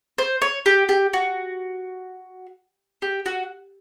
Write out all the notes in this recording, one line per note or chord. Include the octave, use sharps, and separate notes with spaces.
C5
C#5
G4
G4
F#4
G4
F#4